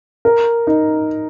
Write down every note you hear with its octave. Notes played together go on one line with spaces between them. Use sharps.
A#4
D#4